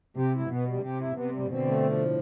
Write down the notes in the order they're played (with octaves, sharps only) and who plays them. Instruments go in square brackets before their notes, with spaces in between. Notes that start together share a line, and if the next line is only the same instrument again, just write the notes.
[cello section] C3 [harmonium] G4
[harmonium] E4
[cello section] B2 [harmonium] B3
[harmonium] G3
[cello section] C3 [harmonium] G4
[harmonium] E4
[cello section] C3 [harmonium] B3
[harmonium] G3
[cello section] B2 D3 [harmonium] C4
[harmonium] A3
F3
A2